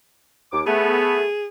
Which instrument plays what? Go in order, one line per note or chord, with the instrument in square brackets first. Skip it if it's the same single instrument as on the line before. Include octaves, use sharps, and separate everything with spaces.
[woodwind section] D#2 D6
[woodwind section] A3 B3 [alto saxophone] G#4